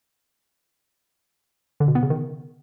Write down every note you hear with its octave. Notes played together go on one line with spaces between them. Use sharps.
D3
B2
B3
C#3
D#3